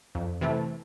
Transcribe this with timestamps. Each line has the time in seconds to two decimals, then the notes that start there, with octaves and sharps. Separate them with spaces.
0.15 F2
0.41 C3 E3 A3